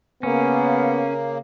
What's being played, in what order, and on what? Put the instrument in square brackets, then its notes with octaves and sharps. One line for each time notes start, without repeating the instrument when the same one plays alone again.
[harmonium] C#3 A#3 [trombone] B3 [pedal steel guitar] C#4